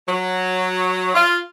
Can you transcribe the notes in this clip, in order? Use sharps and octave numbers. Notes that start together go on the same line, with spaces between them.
F#3
F4